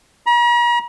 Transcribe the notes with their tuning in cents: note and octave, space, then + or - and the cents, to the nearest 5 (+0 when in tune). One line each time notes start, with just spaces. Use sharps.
A#5 +45